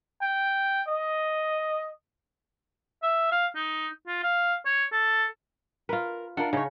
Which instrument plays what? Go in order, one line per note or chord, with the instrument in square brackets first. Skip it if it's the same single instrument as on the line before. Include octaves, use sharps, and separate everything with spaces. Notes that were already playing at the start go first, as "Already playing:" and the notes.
[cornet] G5
D#5
[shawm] E5
F5
D#4
F4
F5
C#5
A4
[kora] F4 B4 [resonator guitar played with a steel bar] A#4
[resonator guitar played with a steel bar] D4 F4 A#4 [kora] F#5
[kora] C#3 [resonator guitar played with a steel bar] D#4 C#5